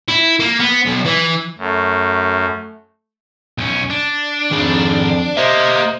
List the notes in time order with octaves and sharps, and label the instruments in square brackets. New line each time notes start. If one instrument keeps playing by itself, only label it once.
[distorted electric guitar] E4
A#3
B3
B1
E3
[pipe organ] F#2 [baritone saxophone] A3
[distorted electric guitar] B1 C#4
D4
[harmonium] F2 [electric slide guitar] D#3 G#4
[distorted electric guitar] A#3 [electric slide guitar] G4 E5 [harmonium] C5 D#5